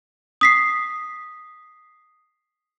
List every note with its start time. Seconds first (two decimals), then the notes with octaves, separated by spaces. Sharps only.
0.41 D#6 B6 C7